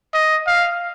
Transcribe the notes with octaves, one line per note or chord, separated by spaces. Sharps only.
D#5
F5